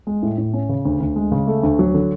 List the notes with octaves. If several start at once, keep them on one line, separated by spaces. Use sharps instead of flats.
G#3
A2
A2
C#4
C#3
D2
D2
G#3
C#3
A3
D2
F#3
D3